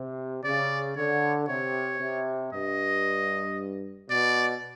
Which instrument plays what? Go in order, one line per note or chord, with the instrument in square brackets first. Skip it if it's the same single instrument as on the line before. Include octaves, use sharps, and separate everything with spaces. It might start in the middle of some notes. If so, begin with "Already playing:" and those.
Already playing: [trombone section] C3
[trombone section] C#3 [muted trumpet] D5
[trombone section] D3 [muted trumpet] C#5
[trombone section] C3 [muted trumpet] C#5
[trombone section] C3
[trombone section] G2 [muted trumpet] D#5
[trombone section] B2 [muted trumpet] D5